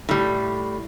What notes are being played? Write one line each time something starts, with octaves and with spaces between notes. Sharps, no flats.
A2 G3